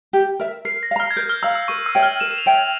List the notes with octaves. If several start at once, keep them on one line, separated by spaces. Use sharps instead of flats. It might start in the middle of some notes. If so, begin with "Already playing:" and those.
G4
A#4 E5
A#4 C7
A#6
F5
A#5 F6
G#6
A#4 G6
F6
F5 A#5 E6
E6
A#4 C#6
E6
C#5 E5 G5
F6
A#4 E7
E7
F7
C#5 E5 G5
F7